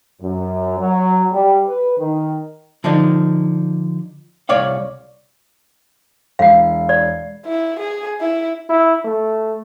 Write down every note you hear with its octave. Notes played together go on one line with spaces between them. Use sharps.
F#2
F#3
G3
B4
D#3
D3 F3 D4 D#4
C2 C#5 D5 F5
E1 F5 C7
D5
E4
G#4
E4
E4
A3